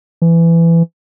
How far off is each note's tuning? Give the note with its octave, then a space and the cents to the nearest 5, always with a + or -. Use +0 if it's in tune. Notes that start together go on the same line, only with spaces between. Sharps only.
E3 +20